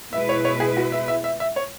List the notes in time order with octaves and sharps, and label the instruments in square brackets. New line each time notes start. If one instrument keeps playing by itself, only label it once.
[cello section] B2 G#3 E4 B4 [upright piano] E5
[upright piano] C#5
C#5
G#4
F#4
E5
E5
E5
E5
C#5